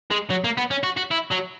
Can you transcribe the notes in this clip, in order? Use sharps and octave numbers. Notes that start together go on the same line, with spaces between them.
G#3
F#3
A#3
B3
C#4
F#4
F#4
E4
F#3